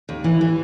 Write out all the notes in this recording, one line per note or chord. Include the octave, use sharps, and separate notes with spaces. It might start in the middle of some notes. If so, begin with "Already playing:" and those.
D#2
E3
E3